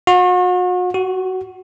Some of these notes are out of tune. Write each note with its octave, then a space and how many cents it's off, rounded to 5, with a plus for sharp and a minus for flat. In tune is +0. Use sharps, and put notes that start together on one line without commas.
F#4 -40
F#4 +15